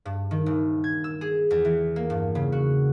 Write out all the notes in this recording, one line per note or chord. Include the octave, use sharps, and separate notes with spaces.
G2
D#3
D#1
G#6
E6
G#4
E2
E3
A#3
G2
C#3
F#4